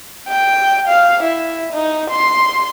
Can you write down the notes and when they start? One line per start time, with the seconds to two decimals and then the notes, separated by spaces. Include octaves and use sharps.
0.28 G5
0.88 F5
1.23 E4
1.73 D#4
2.10 C6